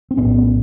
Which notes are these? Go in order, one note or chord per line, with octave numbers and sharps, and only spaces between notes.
C4
A#1 A2 B3 C#4